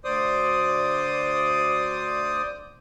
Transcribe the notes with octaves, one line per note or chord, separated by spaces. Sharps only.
D2 C5 D5 D#6